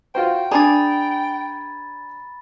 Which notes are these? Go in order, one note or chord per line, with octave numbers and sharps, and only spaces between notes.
F4 F#4 C5 G5
D4 G#4 D5 G#5 A#5 B5 A6